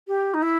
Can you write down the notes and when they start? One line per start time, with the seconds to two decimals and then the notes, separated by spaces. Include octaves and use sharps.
0.08 G4
0.34 D#4
0.42 E4